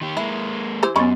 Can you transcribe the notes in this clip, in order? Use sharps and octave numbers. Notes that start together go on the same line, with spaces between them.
D#3 G4
G#3 A#3 E4
E3 E4 G4 C5
F#2 B3 C#4 D#5 B5 C6